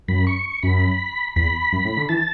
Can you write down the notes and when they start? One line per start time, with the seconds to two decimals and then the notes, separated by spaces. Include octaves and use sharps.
0.08 F#2 B5
0.27 C#6
0.63 F#2 B5
1.36 E2 B5
1.72 F#2
1.85 A2
1.97 D3
2.09 E3 A5